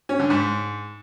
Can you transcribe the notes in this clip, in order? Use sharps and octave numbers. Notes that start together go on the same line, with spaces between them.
C#4
D3
G#2